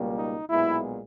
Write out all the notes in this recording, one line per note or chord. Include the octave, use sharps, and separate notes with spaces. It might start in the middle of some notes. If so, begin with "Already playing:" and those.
Already playing: C#2 B2 G3 A#3
D#4
B1 A#2 G#3 B3 E4